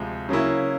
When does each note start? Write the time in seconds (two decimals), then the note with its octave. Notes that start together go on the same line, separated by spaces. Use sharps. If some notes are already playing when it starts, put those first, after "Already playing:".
Already playing: D2 C3 F3 G#3
0.29 C#3 F#3 A#3 C#4 E4